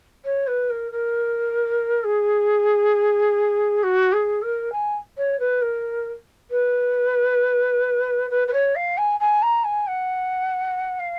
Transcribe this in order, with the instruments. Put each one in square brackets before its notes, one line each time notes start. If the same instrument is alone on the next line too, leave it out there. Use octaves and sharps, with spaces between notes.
[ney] C#5
B4
A#4
A#4
G#4
F#4
G#4
A#4
G#5
C#5
B4
A#4
B4
B4
B4
C#5
F5
G#5
G#5
A#5
G#5
F#5
F5